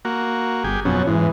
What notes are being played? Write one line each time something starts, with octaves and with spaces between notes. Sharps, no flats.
A#3 F#4
G1 G4 G#4
F2 B2 F#3 C#4
G#2 E3